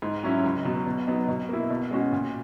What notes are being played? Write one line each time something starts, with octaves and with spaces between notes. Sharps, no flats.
G#2
F#3 C#4 E4
C#2
B2 F#3
B2
F#3 B3 D#4
B2
A#3 E4
B2
G#3 C#4 F#4
A#2